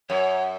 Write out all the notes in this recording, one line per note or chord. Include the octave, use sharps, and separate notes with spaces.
F#2 C#5